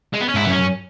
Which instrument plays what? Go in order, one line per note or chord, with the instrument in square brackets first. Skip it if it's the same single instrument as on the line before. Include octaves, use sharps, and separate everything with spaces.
[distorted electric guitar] G#3
B3
C#4
[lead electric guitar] G#2 [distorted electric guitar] E4
[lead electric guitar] F#2 [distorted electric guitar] B3
[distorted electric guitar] C#4
[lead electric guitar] F#2